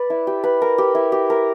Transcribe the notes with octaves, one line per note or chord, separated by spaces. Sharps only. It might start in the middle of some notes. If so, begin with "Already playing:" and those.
Already playing: B4 D5
E4
G4
B4
A#4
G4
E4
G4
A#4